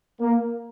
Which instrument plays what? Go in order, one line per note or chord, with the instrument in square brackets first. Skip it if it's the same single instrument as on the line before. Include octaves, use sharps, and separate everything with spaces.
[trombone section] A#3